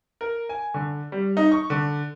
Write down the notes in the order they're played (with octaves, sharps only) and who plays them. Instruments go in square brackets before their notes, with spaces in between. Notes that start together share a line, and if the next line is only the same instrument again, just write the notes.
[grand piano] A#4
G#5
D3
G3
D#4
C#6
D3